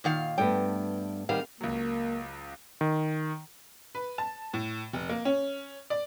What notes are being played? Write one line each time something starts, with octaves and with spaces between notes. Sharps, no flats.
A#2 D#3 F5
G2 A3 B3 G5
D#3 G3 C4 F5
C#2 F#3 A#3
D#3
B4
A5
A2
F1
A#3
C#4
D5